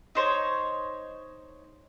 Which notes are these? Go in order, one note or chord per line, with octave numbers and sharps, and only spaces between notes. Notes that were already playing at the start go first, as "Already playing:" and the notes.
D#4 C5 C#5